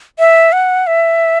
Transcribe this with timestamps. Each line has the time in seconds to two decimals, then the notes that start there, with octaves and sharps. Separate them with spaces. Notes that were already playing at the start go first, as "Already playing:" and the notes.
0.19 E5
0.52 F#5
0.87 E5